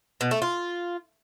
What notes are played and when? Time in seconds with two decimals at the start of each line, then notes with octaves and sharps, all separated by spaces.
0.21 B2
0.31 A3
0.42 F4